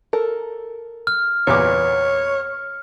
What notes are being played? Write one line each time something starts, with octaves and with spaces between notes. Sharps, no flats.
A4 A#4
F6
E2 A#2 B4 C#5 D6